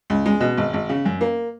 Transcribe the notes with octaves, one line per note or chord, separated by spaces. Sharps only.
C#2
G#3
B2
G#1
G#1
C#3
F#2
A#3